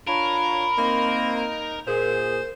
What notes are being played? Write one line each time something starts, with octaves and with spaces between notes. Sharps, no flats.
D4 F4 A#4 C#5 B5
A#3 C4 D#4
A#2 G#4 A#4 C5